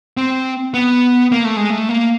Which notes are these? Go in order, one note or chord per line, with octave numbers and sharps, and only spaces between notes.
C4
B3
A#3
A3
G#3
A3
A#3